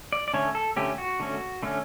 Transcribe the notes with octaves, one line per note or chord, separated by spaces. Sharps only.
D5
D5
D3 A3 C#4 C#5
A4
D3 A3 C#4 G4
F#4
D3 A3 C#4
D3 A3 C#4